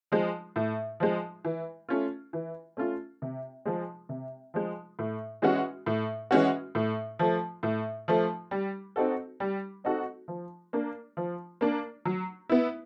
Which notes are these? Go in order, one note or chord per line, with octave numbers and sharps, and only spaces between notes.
F3 G#3
A2
F3 G#3
E3
A3 C#4 F4
E3
A3 C#4 F4
C3
F3 G#3
C3
F3 G#3
A2
E3 G#3 C#4 F#4
A2
E3 G#3 C#4 F#4
A2
F3 A3
A2
F3 A3
G3
C4 D#4 F#4 A4
G3
C4 D#4 F#4 A4
F3
A#3 D4
F3
A#3 D4
F#3
B3 E4